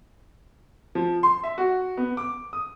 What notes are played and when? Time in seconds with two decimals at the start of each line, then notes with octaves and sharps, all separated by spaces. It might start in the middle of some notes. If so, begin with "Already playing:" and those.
0.95 F3
1.23 C6
1.43 E5
1.58 F#4
1.97 B3
2.17 D6
2.53 D#6